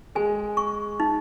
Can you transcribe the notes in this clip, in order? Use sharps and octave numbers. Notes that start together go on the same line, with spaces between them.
G#3 G#5
C#6
D#4